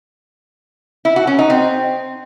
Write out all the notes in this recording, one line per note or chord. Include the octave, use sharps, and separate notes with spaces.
E4
F#4
C#4
D#4
C4